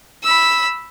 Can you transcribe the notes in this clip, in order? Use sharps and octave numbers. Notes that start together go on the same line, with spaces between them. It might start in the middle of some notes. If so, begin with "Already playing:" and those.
B5 E6